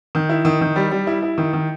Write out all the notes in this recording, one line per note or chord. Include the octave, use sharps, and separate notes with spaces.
D#3
E4
D#3
D#3
G3
G3
E4
E4
D#3
D#3